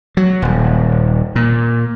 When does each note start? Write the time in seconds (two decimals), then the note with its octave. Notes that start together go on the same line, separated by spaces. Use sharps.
0.17 F#3
0.42 D#1
1.36 A#2